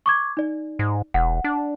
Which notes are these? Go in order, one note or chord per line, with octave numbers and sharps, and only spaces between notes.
C#6 D6 G#6
D#4 D5
G#2
E1 F#5
D4